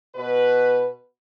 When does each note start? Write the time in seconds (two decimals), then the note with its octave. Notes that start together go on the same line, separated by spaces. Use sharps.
0.15 B2 B4